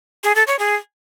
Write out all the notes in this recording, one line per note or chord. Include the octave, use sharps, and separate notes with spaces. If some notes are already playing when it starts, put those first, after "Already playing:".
G#4
A4
C#5
G#4